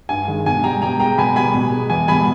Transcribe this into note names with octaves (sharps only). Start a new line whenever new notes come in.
G2 G#5
D#3 G#3
B2 G#5
G3 G5 A#5
B2 G5 A#5
G#3 G5 A#5
B2 G#5 B5
G3 G#5 B5
B2
G#3
E2 G#5
B2 G3 G#5 B5